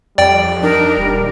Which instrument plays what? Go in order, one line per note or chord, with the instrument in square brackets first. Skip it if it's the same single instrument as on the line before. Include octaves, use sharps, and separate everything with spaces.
[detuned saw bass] F2 [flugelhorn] G3 [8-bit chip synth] D5 G5
[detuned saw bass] D4 [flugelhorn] D#4 [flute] A#4
[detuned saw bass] D#1 [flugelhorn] G3